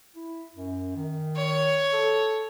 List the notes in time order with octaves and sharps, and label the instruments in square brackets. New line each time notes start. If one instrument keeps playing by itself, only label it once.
[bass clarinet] E4
F#2
D#3
[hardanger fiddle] C#5
[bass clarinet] A4